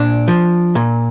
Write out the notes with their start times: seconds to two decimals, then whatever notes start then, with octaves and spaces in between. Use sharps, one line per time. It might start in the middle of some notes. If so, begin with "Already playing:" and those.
Already playing: A#2 D4
0.28 F3
0.75 A#2